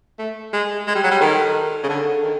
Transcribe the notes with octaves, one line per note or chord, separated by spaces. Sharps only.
A3
G#3
G#3
G3
F#3
G3
D#3 A4
C#3
D3
D#3